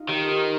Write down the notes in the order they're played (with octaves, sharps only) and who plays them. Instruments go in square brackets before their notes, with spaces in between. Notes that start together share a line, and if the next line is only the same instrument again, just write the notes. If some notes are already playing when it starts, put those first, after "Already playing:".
Already playing: [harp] D#4 F4
[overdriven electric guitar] D#3 [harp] G4 A#4
[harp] A4 C5